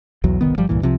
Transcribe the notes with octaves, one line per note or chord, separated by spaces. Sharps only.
B1 E2 F#3
G1 C2 D#3 B3
G1 F3 G3
C2 G2 A#2 E3
C2 C3 F3